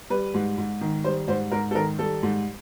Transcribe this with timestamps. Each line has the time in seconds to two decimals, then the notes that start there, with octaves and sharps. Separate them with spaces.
0.10 G3 B4
0.34 G#2
0.58 G#2
0.81 D#3
1.05 G3 C5
1.28 G#2 C5
1.52 G#2 A#4
1.71 A4
1.75 D#3 A#4
1.98 G3 A4
2.23 G#2